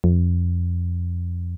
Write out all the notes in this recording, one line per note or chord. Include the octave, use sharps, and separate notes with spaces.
F2